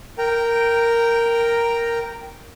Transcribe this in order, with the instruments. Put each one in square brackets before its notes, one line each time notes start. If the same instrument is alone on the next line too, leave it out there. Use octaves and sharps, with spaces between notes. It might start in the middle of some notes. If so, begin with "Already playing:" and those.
[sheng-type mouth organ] A#4 G5 A#5